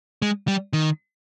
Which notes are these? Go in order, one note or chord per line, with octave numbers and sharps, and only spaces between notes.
G#3
G3
D#3